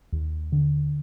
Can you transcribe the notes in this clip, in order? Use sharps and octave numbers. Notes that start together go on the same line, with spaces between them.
D#2
D3